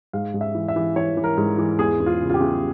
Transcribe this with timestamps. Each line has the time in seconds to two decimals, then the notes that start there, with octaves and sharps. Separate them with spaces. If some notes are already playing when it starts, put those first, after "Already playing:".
0.13 G#2 F5
0.34 G#2
0.41 E5
0.55 E3
0.68 E5
0.76 E3
0.96 E3 C#5
1.17 E3
1.24 A#4
1.37 G#2
1.58 E3
1.79 E2 G#4
2.00 E2
2.06 F4
2.21 C#3
2.29 F4
2.34 G4
2.40 E2